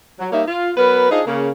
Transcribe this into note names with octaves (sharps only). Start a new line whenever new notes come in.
F#3
G3 A#3 D#4 C#5 E5
F4
F#3 B3 A#4 B4
D4 D#4 F4 G#4 C5 D#5
C#3 A#3